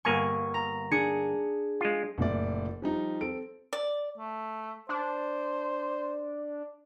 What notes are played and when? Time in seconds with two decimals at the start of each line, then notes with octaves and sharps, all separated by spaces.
0.05 G1 A#3 G#5 C#6
0.54 A#5
0.91 D4 G#4 C#7
1.81 G#3 F4
2.18 F#1 A#2 A3 D5
2.82 F3 G3 D#4
3.21 C4 A4 D7
3.73 D5
4.17 A3
4.89 D4 C5